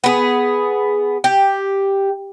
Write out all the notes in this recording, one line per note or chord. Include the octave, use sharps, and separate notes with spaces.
B3 G#4
G4